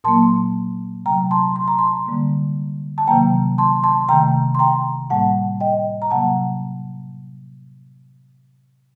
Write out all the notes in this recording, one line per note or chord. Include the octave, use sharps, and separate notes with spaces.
A#2 F#3 A#3 A5 C6
C3 F#3 A3 G5 A#5
A5 C6
C6
A#5
A5 C6
D3 G3 A#3
A5
C3 D#3 F#3 A#3 G5 A#5
A5 C6
A5 C6
C3 D#3 A3 G5 A#5
C6
G5 A#5
A2 G3 A#3 F#5 A5
D#5 G5
A#5
C3 F#3 A#3 F#5 A5